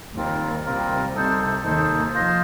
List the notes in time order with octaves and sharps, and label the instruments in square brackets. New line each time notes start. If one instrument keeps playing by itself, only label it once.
[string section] D#2 D#3 [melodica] G3 C4 F4 A#4
[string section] C2 C3 [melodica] G3 C4 F4 A#4
[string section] C2 C3 [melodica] D#4 A4 C5
[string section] D#2 D#3 [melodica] D#4 A4 C5
[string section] F3 [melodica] F4 C5 D#5